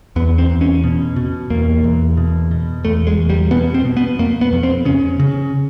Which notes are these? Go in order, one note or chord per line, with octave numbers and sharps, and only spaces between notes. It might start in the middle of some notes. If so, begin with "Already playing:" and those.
E2 B3
C4
E2
C#4
B2
B2
E2 A#3
E2
B2
B2
E2 A3
G#3
E2
G3
B2 B3
C4
B2
B3
F2 A#3
B3
F2
C4
C#3 C#4
C#3